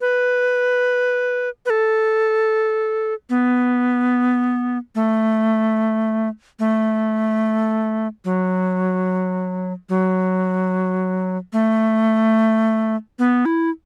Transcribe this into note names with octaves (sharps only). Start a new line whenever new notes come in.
B4
B4
A4
B3
A3
A3
F#3
F#3
A3
B3
E4